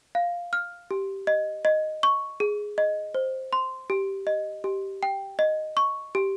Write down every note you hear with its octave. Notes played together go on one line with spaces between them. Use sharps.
F5
F6
G4
D#5
D#5
C#6
G#4
D#5
C5
C6
G4
D#5
G4
G5
D#5
C#6
G4